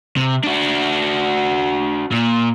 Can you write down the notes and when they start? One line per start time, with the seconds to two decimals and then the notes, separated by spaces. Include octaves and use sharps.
0.16 C3
0.43 D4 F#4
2.12 A#2